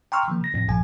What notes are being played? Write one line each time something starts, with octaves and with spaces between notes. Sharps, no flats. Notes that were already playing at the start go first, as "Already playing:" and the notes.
G5 A#5 C6 C#6 E6 F6
D#3 F3 A#3
C#3 A#6
F2 A2 A#6
A#1 G2 A#2 F3 G#5